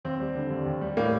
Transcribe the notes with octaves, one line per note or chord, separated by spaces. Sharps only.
D#2 C4
G3
D3
D#2
D#2
G3
A2 A#3